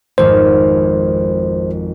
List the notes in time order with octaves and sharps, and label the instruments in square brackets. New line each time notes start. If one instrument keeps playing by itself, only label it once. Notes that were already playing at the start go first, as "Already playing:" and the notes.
[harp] G#1 F2 [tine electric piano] C5